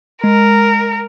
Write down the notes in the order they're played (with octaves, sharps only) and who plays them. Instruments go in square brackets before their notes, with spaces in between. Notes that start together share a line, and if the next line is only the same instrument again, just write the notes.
[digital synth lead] G#3 [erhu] A#4